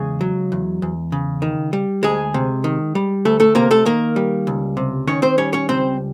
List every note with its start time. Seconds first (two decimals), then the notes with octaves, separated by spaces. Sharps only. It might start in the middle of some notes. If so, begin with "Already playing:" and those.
Already playing: E2 C#3 G#3 G#4
0.21 F#3
0.52 E2
0.82 E2
1.12 C#3
1.42 D#3
1.73 G3
2.03 D2 G#3 G#4
2.34 C3
2.64 D#3
2.95 G3
3.25 D2 A3 A4
3.40 A3 A4
3.55 C3 A#3 A#4
3.71 A3 A4
3.85 D#3 A#3 A#4
4.16 G3
4.47 C#2
4.77 C3
5.07 D#3 C#4 C#5
5.22 C4 C5
5.38 G3 C#4 C#5
5.53 C#4 C#5
5.69 C#2 C4 C5